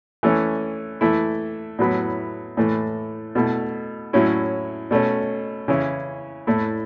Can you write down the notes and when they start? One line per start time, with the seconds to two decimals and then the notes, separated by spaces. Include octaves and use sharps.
0.23 E3 A3 C#4
1.01 E3 A3 E4
1.79 A2 F#3 B3 E4
2.57 A2 E3 A3
3.35 B2 A3 E4
4.13 A2 F#3 C#4 E4
4.91 B2 A3 C#4
5.68 C#3 E3 C#4 E4
6.47 A2 A3 E4